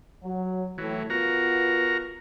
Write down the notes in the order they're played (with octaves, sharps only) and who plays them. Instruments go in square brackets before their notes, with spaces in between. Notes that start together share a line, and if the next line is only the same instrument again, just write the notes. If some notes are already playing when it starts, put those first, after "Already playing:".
[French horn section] F#3
[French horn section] A2 [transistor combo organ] E3 F#3
[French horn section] B2 B3 F4 [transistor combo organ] F#4 A#4 A#5